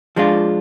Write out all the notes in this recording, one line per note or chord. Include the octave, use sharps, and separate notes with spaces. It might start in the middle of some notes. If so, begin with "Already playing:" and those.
F3 G#3 D4 F4